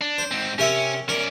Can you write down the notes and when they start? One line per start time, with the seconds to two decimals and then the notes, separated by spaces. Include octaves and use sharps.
0.01 D4
0.18 C5
0.31 G#2 C4
0.58 C3 C#4 A#4 E5
1.09 C#4 A#4 D5